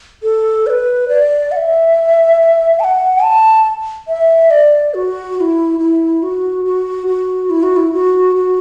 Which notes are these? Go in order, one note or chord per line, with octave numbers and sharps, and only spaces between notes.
A4
D5
B4
D5
F#5
E5
A5
F#5
A5
E5
D5
F#4
F#4
E4
E4
F#4
F#4
F#4
E4
F#4
E4
F#4
F#4